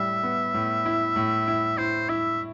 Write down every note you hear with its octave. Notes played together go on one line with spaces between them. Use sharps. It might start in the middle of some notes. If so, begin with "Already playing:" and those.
Already playing: A2 G3 E5
B3
A2
E4
A2
E4
E4 C5
E4 E5